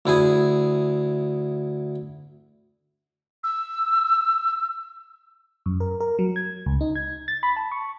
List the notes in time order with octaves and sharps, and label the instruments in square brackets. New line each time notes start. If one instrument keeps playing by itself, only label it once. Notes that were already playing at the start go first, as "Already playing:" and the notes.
[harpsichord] D2 E4 G#4 G#5
[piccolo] E6
[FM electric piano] F#2
A#4
A#4
F#3
G#6
C#2
D#4
G#6
A6
B5
A5
C#6